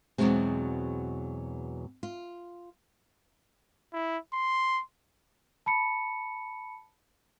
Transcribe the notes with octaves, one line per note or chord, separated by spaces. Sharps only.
E2 G2 B2 F#3 G#3 C4
F4
E4
C6
A5 B5 C#7